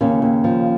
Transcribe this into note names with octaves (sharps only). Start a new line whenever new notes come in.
D#2 C#3 C#4
D#2
F3